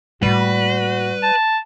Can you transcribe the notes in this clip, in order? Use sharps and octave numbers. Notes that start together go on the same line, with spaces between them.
A2 G3 A#3 F#4 B4
A5